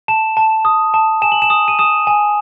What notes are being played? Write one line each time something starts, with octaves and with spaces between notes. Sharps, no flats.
A5 E7
A5
D#6
A5
G#5 E7
F#7
E7
D#6
D#7
D#6 E7
G#5